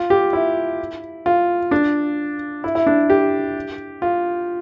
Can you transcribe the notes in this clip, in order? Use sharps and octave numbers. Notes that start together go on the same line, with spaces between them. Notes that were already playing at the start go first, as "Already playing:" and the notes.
Already playing: F4
G4
E4
F4
D4
E4
E4
D4
G4
F4